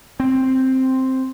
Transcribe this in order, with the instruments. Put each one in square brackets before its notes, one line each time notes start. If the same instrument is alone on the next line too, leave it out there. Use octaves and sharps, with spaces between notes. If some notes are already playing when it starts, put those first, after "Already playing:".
[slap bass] C4